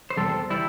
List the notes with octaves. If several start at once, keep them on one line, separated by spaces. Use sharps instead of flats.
C5
E2 C3 G3 A4
E3 G3 E4